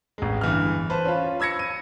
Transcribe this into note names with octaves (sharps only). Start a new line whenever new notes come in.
A1 G#3
G1 E3 F6
B4 C5 A5
C#4 F4
B5 E6 G#6 A#6 C#7
D#7